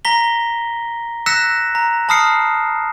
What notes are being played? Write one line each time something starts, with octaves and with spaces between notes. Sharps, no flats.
A#5 A#6 B6 G7
E6 F#6 A#6 B6 C#7 E7
A#5
A5 B5 D#6 F6 C7 C#7